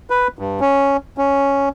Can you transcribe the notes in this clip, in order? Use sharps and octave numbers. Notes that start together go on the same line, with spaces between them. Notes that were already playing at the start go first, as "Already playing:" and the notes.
B4
G2
C#4
C#4